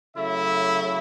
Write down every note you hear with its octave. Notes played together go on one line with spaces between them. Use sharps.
C#3 F#3 A3 E4 E5